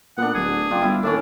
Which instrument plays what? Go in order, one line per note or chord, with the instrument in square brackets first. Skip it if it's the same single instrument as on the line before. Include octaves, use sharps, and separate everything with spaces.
[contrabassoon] A#2 [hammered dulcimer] B3 D4 [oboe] F#5
[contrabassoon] D1 [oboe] G#4
[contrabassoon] F#1 [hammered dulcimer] D4 F4 G4
[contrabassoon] G1 [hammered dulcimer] E4 F5
[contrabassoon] D#2 [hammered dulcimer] A2 A3 C#4 [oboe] D4